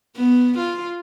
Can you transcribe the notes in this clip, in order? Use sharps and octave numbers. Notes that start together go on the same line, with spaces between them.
B3
F4